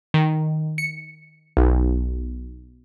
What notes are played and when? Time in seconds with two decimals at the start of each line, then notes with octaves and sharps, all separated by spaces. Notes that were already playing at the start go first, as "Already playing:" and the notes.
0.14 D#3
0.78 C#7
1.57 B1